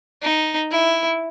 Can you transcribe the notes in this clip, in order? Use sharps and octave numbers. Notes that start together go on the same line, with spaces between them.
D#4
E4